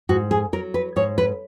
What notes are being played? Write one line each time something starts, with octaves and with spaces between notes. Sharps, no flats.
G#2 F#4
G#4
F#3 A#4
B4
G#2 C#5
B4